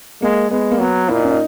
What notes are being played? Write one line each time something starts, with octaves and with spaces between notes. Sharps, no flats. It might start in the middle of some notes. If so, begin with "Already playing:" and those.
G#3 A#3
G#3 B3
A#3
F#3 B3
A#2 E4
D#4
C#4
D#4